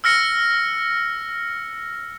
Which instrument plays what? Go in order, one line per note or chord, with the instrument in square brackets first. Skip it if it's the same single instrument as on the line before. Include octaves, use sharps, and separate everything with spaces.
[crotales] E6 F6 A#6 C#7